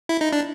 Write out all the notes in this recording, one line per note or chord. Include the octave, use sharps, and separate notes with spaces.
E4
D#4
D4